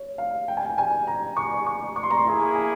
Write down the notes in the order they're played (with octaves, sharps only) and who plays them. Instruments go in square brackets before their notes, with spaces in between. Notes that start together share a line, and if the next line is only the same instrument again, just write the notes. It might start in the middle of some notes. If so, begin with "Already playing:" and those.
Already playing: [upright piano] C#5
F5
G5
G#5
G5
G#5
A#5
C#6
C#6
C#6
C6
A#5
C6
[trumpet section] A#3 E4 G#4 [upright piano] A#5
[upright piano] G#5